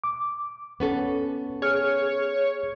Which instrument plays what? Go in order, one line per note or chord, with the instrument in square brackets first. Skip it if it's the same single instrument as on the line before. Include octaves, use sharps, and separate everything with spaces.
[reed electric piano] D6
[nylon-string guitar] B3 C#4 A4
[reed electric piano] G#4 F6 [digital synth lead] C#5